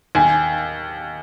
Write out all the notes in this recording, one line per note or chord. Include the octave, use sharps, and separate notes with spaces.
D#2 G#5